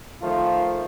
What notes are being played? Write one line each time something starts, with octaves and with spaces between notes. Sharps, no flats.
D#3 F3 A3 F4